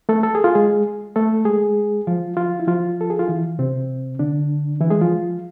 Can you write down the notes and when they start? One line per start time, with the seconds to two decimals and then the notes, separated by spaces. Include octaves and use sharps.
0.09 A3 A4
0.23 A4
0.35 G#4
0.44 F4
0.55 G#3 G#4
1.16 A3 A4
1.45 G#3 G#4
2.07 F3 F4
2.37 F3 F4
2.60 E4
2.68 F3 F4
3.01 A4
3.10 G#4
3.19 F4
3.28 E3 E4
3.59 C3 C4
4.19 D3 D4
4.81 E3 E4
4.90 G#3 G#4
5.01 F3 F4